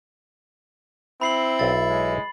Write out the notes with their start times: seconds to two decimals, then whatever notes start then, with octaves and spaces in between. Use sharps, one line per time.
1.21 C4 E4 B5 C7 F#7
1.59 B1 E5 A6
1.90 G#3